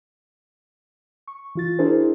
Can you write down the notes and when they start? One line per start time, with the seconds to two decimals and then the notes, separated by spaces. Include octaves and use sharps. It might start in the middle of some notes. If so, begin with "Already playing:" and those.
1.27 C#6
1.55 E3 F4 A6
1.79 D4 E4 F#4 G#4 A#4 C5